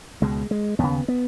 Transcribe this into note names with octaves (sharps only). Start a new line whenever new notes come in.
C#2 B2 G#3
G#3
D#2 C#3 B3
B3